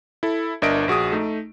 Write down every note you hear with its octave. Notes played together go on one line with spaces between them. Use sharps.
E4 A4
G1 D4 A#4 D#5 E5 D7
A#1 F#4 G#4 D#6
A3 D#4